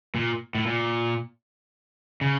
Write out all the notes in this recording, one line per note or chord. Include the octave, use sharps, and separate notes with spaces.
A#2
A2
A#2
C#3